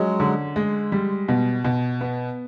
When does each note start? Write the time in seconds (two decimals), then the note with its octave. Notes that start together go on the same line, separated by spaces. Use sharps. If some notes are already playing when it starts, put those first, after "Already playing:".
Already playing: F3 F#3 G#3 C#4
0.20 D3
0.56 G#3
0.92 G3
1.28 B2
1.65 B2
2.01 B3